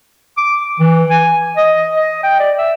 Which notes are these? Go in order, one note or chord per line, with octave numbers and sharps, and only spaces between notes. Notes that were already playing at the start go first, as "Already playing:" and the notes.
D6
E3
G#5
D#5
D#5
G5
D5
E5